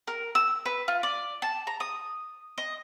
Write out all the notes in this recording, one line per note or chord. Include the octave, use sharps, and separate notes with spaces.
A#4
E6
B4
F4
D5
A5
A#5
D#6
D#5